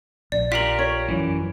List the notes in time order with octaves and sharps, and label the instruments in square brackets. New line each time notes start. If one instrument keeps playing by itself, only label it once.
[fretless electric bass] A#1 [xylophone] D5
[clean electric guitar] F4 G4 A#4 [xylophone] B6 F#7
[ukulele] C#5
[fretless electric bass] F#2 [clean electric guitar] E3